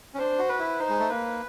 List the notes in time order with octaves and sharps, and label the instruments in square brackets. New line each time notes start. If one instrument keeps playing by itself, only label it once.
[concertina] C#4
[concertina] D4 [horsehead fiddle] C5
[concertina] F#4
[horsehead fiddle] B4
[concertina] E4
[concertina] D#4 [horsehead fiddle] C5
[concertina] G#3
A3
[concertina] A#3 [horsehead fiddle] B4